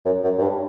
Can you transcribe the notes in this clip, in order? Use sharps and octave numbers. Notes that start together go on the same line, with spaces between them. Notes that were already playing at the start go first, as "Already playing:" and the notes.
F#2
F#2
F#2
G2